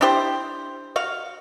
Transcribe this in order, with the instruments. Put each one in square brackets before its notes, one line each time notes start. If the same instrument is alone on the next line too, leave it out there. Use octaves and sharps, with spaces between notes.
[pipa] D4 E4 G4 C5
F#4 F5